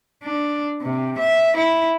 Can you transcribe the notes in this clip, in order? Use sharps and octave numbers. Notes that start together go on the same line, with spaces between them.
D4
C3
E5
E4